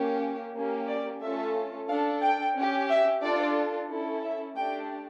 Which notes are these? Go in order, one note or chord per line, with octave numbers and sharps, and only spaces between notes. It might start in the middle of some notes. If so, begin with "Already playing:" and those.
Already playing: A#3 C#4 G4
A#3 C#4 G4
D5
A3 C#4 F4 A4 E5
D4 A4 F5
G5
C#4 G4
E5
D4 F4 A4 D5
C#4 E4 A4
E5
A3 D4 G4 G5